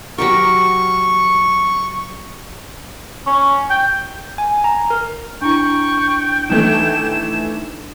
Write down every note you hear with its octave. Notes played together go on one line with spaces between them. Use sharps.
F#3 G4 A#4 C#6
C#4
G5
G#5
A#5
A#4
D4 E4 G5 C#6
D#3 E3 A3 E7